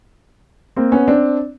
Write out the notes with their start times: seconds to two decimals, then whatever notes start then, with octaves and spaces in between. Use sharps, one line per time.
0.77 A#3 C4
0.92 B3 C#4
1.08 C4 D4